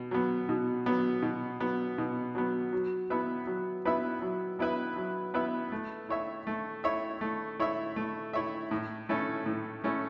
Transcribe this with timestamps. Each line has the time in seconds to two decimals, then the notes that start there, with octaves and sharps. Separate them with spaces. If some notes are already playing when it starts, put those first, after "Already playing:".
Already playing: B2
0.11 F#3 B3
0.49 B2
0.86 F#3 B3
1.22 B2
1.60 F#3 B3
1.98 B2
2.35 F#3 B3
2.72 F#3
3.10 B3 E4 B4 E5
3.47 F#3
3.85 B3 E4 B4 E5
4.22 F#3
4.59 B3 E4 B4 E5
4.97 F#3
5.34 B3 E4 B4 E5
5.72 A3
6.09 E4 C#5 E5
6.47 A3
6.84 E4 C#5 E5
7.21 A3
7.60 E4 C#5 E5
7.96 A3
8.33 E4 C#5 E5
8.71 A2
9.09 A3 C#4 E4 A4
9.46 A2
9.84 A3 C#4 E4 A4